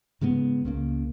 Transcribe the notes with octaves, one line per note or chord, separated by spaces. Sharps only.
G#2 C#3 G#3 B3
C#2 C#3 A#3